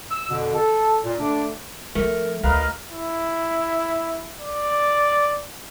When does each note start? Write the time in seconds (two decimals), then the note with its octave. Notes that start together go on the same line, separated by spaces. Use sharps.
0.11 E6
0.30 F2 B2 D3
0.54 A4
1.05 A#2
1.19 D3 A3 D4
1.95 F3 A3 C4 A#4
2.43 D2 A#4 B4 D#5 F5
2.90 E4
4.40 D5